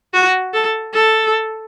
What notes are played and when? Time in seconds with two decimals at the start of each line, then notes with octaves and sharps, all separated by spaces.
0.14 F#4
0.54 A4
0.94 A4